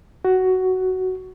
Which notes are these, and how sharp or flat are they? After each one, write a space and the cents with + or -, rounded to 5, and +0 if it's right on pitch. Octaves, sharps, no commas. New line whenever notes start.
F#4 +10